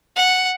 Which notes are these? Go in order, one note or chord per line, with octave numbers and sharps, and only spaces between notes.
F#5